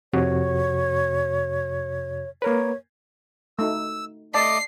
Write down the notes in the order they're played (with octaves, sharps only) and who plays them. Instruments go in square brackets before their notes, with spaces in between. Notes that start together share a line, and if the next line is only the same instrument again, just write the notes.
[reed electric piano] F2 C3 F#4 [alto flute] C#5
[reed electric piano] A#3 A#4 B4 [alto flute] C#5
[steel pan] A3 D#4 F#4 [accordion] E6
[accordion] A3 D#5 [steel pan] D5 A5 [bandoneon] D6 [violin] C7